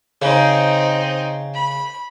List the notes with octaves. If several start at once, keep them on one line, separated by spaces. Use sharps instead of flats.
C#3 C4 D#4
B5